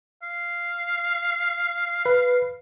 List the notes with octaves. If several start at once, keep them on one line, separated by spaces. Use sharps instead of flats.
F5
B4